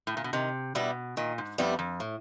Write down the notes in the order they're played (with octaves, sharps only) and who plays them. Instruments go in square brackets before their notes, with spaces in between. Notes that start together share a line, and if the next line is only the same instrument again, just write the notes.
[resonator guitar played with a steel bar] A2
A#2
B2
[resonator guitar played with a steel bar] C3 [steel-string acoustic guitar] D#3
[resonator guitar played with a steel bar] B2 [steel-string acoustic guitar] G3 B3 E4 G4
[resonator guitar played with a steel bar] A#2 [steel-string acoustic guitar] D#3
[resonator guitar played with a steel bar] G#2
[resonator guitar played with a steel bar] F2 [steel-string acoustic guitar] G3 B3 E4 G4
[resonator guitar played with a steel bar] F2
[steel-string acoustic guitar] A2